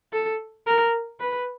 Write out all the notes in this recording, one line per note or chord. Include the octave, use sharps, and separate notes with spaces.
A4
A#4
B4